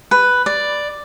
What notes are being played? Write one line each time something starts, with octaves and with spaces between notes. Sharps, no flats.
B4
D5